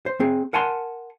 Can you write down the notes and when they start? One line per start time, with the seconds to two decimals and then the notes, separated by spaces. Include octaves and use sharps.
0.06 C5
0.20 C4 G#4
0.53 A#4 F#5 G#5 A5 C6